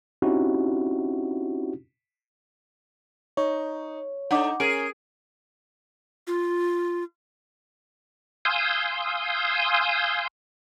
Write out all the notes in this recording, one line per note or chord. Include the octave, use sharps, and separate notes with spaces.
C4 C#4 D#4 E4 F#4 G4
D#4 C#5
D4 D#4 A4 F#5 D6
C#4 G#4 A#4 D7
F4
F5 G#5 C6 D#6 E6 G6